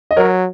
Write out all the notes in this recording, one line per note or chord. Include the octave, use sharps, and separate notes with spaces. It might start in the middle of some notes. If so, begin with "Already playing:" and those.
D#5
F#3 A#4 C#5